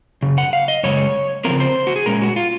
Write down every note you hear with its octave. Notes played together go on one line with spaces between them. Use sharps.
F#2 C#3
F#5
F5
D#5
F#2 C#3 G#3 C#4 C#5
C#3 F3 C4 A#4
C5
F#4
G#4
A#2 G#3 C#4 A#4
F#4
F4